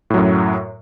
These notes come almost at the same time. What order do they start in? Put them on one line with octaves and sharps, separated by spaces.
A2 F#3 F#2